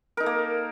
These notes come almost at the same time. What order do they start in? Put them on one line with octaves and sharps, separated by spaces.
A#4 D#4 A4 A#3